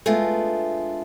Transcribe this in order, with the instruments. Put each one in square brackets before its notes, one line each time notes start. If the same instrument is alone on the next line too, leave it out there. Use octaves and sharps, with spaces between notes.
[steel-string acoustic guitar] G#3 A3 B3 D4 F4